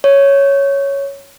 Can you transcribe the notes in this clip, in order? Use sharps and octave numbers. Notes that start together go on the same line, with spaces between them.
C#5